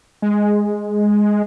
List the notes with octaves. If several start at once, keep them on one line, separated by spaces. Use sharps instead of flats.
G#3